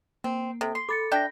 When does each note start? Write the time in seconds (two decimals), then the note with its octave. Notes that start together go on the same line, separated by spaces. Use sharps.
0.24 A#3 C4
0.61 C3 A4
0.75 C6 C7
0.89 A4 B5 D6 A6 C#7
1.12 D4 E5 G5 G6 A#6